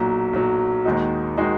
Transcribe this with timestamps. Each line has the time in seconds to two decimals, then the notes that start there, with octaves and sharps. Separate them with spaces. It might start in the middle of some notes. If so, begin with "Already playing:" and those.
Already playing: B1 A#2 F#3
0.33 B1 A#2 F#3
0.85 D#2 D#3 G#3 D#4 F#4
1.37 D#3 G#3 D#4 F#4